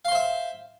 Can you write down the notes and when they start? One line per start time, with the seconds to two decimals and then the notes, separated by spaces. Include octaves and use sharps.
0.05 F5
0.08 C6
0.11 C5
0.15 E5